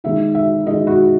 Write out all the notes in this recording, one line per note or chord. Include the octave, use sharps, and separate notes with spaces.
D#3 G#3 D#4 E5
E5
D#3 G#3 D#4 D#5
F#4